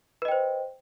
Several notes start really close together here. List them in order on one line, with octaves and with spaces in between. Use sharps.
B4 D#5 G5 C5